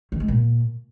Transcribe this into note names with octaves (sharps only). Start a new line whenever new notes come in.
D#3
G#3
A#2